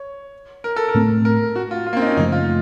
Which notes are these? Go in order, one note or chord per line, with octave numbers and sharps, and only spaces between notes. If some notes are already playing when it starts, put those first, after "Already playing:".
Already playing: C#5
A#4
A4
A#4
A2 A3 C4
A#4
F#4
F4
F4
A#3
C4
D#4
C#4
F#2 C#3 F3 A3 D#4
F4